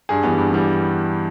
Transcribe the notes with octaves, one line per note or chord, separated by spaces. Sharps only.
G2 G#4
E3 G3 B3
G2
E3 G3 B3